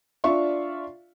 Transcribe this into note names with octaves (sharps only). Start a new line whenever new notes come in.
D4 F4 D5 E5 F5 C#6